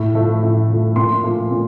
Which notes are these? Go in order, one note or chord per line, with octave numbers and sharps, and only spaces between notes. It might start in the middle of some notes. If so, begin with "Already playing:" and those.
Already playing: A2
F3 A3
A2
F3 A3
A#2 C6
F3 A3
A#2